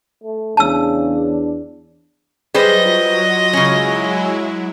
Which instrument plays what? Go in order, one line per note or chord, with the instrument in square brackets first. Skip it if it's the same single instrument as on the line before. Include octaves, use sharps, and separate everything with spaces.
[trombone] A3
[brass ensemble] E2 D4 [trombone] C#3 [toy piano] A5 E6
[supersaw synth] F#3 [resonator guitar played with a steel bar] G3 B4 C5 [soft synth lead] G#4 [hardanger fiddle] D#5
[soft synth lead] F4
[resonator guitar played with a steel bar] C#3 C#4 [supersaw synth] F#3 G#3 E4